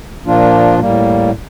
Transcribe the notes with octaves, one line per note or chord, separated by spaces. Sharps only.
A#2 F3 A#3 D4 F4
A2 G3 A#3